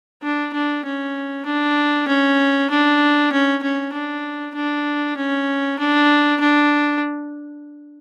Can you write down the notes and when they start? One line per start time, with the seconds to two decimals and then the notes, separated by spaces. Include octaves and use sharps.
0.23 D4
0.54 D4
0.85 C#4
1.46 D4
2.07 C#4
2.70 D4
3.32 C#4
3.63 C#4
3.93 D4
4.55 D4
5.17 C#4
5.79 D4
6.40 D4